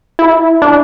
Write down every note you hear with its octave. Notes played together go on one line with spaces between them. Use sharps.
E4
D4